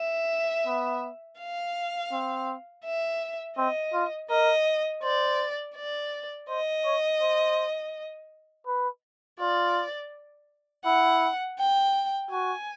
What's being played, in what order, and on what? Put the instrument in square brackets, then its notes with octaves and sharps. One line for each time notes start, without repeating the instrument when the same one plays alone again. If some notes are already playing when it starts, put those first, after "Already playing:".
Already playing: [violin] E5
[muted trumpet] B3
[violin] F5
[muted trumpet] C4
[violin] E5
[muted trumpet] C4 [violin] D#5
[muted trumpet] F4
[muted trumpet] A#4 [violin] D#5
[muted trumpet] C5 [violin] D5
[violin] D5
[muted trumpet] C5 [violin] D#5
[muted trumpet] C#5
C5
B4
[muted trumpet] F4 [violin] D5
[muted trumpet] E4 [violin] F#5
[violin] G5
[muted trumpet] F#4 [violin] G#5